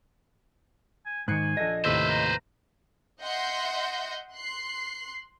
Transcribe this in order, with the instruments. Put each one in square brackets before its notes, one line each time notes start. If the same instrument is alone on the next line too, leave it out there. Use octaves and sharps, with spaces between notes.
[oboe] G#5
[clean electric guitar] G#2 D#3 [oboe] G#5 [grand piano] F#6 C7 C#7
[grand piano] A#1 A4 A#6 [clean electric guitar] D#5
[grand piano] D#2 A2 C3 [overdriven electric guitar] B4 C5 [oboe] E6
[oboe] A#5
[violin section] D#5 E5 F#5 C6 G6 A#6
C6 F#6 C7